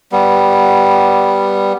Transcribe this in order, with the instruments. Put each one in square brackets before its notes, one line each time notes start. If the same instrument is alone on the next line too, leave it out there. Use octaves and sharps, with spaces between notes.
[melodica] G3 B3